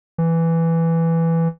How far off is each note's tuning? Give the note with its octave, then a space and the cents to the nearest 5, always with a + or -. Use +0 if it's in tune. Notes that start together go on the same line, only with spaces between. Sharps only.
E3 +5